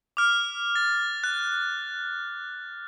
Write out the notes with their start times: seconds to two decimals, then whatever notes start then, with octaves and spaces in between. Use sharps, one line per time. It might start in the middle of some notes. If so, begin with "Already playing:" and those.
0.17 D6 F6
0.76 A6
1.24 F#6